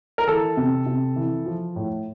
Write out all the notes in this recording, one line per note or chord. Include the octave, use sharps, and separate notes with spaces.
A#4
E3 A4
C3
C3
E3
F3
A2